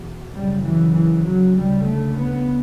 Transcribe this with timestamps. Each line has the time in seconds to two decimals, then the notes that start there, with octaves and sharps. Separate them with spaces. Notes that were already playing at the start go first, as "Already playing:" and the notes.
Already playing: E2 B2
0.34 F#2 C#3 G3
0.64 E3
0.95 E3
1.25 F#3
1.56 D2 C#3 G3
1.87 A3
2.18 B3